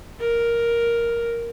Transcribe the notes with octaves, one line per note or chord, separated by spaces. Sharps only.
A#4